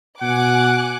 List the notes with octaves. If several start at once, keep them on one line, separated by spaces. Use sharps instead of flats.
B2 F#5 G#5 D6 F#6